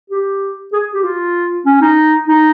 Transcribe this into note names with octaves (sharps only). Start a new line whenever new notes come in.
G4
G#4
G4
F4
C#4
D#4
D#4